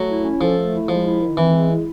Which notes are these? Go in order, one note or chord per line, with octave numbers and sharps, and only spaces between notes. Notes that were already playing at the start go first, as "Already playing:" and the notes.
Already playing: F#3 A3
E4
C#4
F3 A4
A3
E4
F3 G#3
E4
D#3
E3 C4
G#3
E4